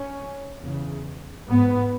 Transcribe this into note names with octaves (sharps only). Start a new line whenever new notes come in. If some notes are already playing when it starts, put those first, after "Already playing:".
Already playing: C#4
E2 C#3
G#2 B3